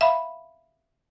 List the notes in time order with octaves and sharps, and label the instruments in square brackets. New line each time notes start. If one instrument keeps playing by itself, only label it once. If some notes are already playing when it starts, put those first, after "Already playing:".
[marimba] E5 F5 B5